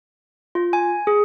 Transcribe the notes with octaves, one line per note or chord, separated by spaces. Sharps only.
F4
G#5
G#4